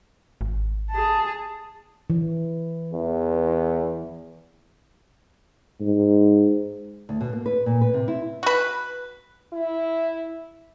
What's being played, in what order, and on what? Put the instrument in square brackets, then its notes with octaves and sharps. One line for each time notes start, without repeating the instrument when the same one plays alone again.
[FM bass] G#1
[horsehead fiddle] G#4 A5
[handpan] E3
[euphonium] E2
[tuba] G#2
[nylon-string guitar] D2
B2
A#3
B4
A#2
B4
C3
E4
[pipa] F#4 B4
[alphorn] E4